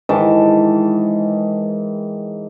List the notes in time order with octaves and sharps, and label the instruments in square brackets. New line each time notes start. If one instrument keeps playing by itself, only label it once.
[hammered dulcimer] G#2 D#3 E3 A5